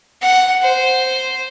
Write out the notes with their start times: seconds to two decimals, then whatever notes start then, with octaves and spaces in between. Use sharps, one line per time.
0.22 F#5
0.62 C5